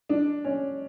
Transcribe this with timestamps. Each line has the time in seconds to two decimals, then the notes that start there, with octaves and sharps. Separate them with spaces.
0.09 D4
0.44 C#4